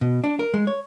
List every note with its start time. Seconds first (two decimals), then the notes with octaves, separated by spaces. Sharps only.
0.01 B2
0.24 D4
0.39 A#4
0.54 G#3
0.67 C#5